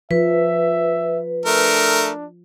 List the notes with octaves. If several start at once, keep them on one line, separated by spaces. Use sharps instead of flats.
F3 B4 E5
A3 D4 A#4